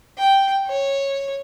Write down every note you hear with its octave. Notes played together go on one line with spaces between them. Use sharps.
G5
C#5